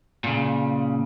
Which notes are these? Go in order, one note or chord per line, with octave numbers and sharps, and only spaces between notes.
A#2 C#3